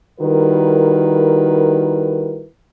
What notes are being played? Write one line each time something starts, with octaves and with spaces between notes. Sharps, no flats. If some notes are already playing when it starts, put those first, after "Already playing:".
D#3 G3 E4 F#4 A#4 B4